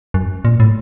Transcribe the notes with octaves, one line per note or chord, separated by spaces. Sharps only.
F#2
A#2
A2